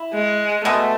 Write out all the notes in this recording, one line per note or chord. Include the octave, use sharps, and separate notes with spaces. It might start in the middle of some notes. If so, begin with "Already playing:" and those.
Already playing: E4
G#3
B2 G#3 A3 B3